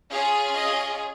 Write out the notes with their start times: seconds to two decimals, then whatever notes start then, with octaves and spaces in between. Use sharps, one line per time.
0.11 C#4 F4 G#4 C#5
0.55 D#5